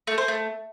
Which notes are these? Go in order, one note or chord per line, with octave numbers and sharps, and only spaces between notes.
A3
C5
A3